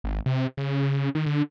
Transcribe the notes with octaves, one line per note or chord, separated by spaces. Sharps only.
G#1
C3
C#3
C#3
D#3
D3